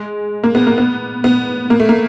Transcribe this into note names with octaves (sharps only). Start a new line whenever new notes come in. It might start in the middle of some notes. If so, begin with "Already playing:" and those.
Already playing: G#3
A#3
B3
A#3
B3
B3
A#3
A3
A#3